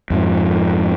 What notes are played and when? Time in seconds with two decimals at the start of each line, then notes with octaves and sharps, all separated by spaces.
0.10 F2 G#2 F3